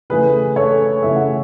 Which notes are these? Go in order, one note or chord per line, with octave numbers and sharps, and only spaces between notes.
C#3 E3 A3 G#4 B4
A4 C#5
C#3 E3 A3 E5
F#5